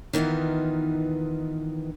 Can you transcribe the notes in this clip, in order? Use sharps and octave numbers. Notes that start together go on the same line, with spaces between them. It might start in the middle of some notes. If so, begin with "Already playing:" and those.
D#3 E3 B3 D#4 F4